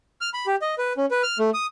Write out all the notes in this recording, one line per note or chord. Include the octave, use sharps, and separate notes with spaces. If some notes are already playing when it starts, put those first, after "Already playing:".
F6
B5
G4
D#5
B4
C#4
B4
F6
A3
D#6